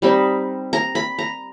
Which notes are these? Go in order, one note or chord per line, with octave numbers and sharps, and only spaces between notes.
G3 C4 D#4 B5
A#5
B5
A#5